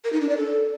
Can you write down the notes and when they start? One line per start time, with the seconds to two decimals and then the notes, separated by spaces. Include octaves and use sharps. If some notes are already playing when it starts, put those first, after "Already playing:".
0.04 A#4
0.13 D#4
0.21 D4
0.29 D5
0.37 A4